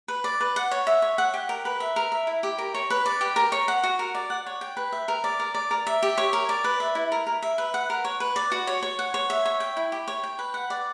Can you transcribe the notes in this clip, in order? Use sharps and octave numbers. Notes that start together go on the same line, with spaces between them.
B4
D5
B4
F#5
C#5
E5
C#5
F#5
G4
A#4
B4
E5
A#4
E5
E4
G4
A#4
C#5
B4
D5
G4
A#4
C#5
F#5
F#4
A#4
D5
F#5
C#5
G5
B4
E5
A#4
D5
A#4
D5
A#4
E5
G4
C#5
A#4
D5
B4
E5
E4
A#4
A#4
E5
B4
F#5
A#4
C#5
B4
D5
F#4
C#5
C#5
F#5
C#5
E5
C#5
G5
E4
G4
C#5
G5
B4
F#5
D5